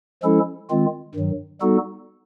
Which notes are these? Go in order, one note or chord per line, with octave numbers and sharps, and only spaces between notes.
F3 G#3 C#4 E4 A4
D#3 G#3 C4 F4
G2 D#3 F#3
G3 B3 D#4 F#4 A4